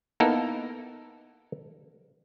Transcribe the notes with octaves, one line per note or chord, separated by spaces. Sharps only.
A#3 B3 D#4 E4 A4 A#4